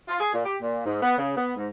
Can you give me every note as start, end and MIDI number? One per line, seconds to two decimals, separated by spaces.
0.09 0.17 65
0.20 0.33 68
0.33 0.42 46
0.45 0.57 67
0.62 0.86 46
0.86 0.99 44
1.03 1.15 59
1.18 1.34 49
1.37 1.53 59
1.56 1.69 44